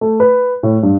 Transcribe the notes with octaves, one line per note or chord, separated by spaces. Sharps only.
A3
B4
A2
G2